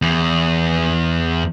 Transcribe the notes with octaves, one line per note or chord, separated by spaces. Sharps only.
E2